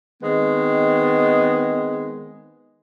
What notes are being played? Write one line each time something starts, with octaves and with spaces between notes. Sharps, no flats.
D#3 G#3 B3 C4